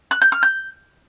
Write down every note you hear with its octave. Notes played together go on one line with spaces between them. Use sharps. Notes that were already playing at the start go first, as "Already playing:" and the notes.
F#6
G6
F6
G6